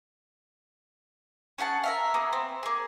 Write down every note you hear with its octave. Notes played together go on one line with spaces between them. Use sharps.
C#4 G#4 F#5 A5
A#4 E5 F5
A#3 B3 G#4
C4
A#3 G#4